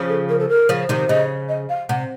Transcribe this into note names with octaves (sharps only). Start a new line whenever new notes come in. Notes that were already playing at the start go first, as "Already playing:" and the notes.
Already playing: C#3 F3
A4
A#4
A4
A#4
C#3 F3
C3 D#3
C#3 D#5
D#5
F5
C3 F#5